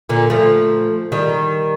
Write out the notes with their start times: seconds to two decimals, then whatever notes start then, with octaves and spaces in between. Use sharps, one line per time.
0.09 A#2 D3
0.30 F3 A3
1.12 D#3 G3